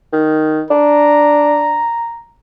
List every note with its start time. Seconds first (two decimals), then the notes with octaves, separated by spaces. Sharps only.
0.12 D#3
0.71 D4 A#5